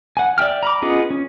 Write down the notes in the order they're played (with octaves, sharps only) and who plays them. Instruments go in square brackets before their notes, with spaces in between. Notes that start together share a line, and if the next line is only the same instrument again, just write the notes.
[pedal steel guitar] F#5 G#5
D5 E5 G5 F6
A#5 B5 D6
B3 C#4 F4 G#4 D#5
C#4